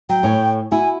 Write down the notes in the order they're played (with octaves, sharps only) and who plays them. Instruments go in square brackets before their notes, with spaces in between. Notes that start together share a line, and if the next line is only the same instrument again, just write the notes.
[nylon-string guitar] F#3 [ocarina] G5
[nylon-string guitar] A2 C#5 G#5
[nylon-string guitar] E4 F#4 [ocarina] G#5